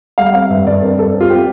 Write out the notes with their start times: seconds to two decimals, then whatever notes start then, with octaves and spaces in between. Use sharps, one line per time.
0.18 G3 F5
0.34 C4 F5
0.50 G2 E5
0.67 G2 D5
0.82 C4 A#4
0.98 G2 A4
1.15 C4
1.20 F4
1.30 C4 G4